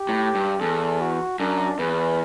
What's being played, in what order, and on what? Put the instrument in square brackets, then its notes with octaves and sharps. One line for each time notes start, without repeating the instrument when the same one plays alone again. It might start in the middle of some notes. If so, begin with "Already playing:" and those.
Already playing: [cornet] G4
[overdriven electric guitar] A2
G2
[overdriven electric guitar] E2 [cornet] A4
[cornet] F#4
[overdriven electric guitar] F#2 [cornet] D4
[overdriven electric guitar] E2 [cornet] B4